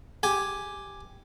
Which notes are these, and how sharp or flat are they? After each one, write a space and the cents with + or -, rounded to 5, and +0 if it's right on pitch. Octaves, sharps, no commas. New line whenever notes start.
G4 +0 G#5 +0